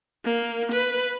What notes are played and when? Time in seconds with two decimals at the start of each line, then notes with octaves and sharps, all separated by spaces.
0.25 A#3
0.72 B4